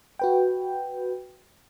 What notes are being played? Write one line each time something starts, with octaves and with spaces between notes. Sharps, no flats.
F#4 B4 G5